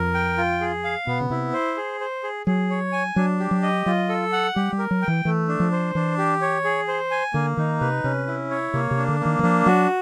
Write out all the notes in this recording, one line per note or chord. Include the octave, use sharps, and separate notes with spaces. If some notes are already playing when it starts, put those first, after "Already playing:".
Already playing: F2 A#4
G5
F4
G#4
F5
B2 B3
C#3
C3 E4
C5
G#4
C5
G#4
F#3 G#4
C#5
G#5
F#3 D4
G4
F#3
D#5
F#3 F4
A4
F#5
G3 G4
G3
A#4
F#3
G5
E3
E3 A3
D4
F3
C5
E3 D4
G4
C#5
G#4
C5
G#5
D3 A#3
D#3 D#4
C3 B4
C3 C#4
E4
C#5
C3 A#3
C3
D4
D3
A#3
D#3
E3
F3 D4
F#3 F#4